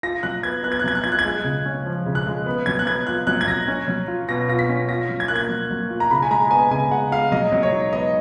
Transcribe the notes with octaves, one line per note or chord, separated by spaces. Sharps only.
F4 A#6
F#3 F#6
B3 G#6
B3 F#6
G#6
F#6
F#3 G#6
F#6
F4 G#6
F#6
G#6
G#3 F#6
C#3
C#4
F3
C#3
F#6
G#3
B3
F#3 G#6
F#6
B3 G#6
F4 F#6
F#3 F#6
G#6
F#3 A#6
C#4
F#3
F4
B2 A#6
F4 A#6
B6
C#4
F4 A#6
F#3
G#6
A#3 F#6
G#6
F#3
F#3
F4
A#5
C#3 B5
G#5
G#3 A#5
B3 G#5
C#3 G#5
G#3 F#5
G#3 F5
F#3 D#5
F#3
C#5
D#4
B3 D#5